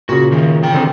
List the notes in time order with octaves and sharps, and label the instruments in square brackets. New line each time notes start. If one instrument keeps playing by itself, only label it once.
[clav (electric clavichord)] A#2 C#3 [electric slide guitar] F#4
[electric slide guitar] D#3 F3
E3 G5
[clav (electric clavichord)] D3 C4 G#4